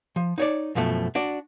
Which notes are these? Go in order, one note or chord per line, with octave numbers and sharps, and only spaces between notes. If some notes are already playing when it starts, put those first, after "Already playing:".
F3
D#4 C#5 D5
F#2 B2 F3 A3
D4 F#4 D5